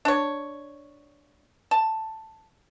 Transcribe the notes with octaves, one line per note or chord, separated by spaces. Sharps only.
D4 C#5
A5